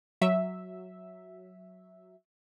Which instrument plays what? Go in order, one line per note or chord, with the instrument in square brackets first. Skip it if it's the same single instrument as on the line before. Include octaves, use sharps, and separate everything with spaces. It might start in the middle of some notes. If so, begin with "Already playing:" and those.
[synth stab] F#3 E5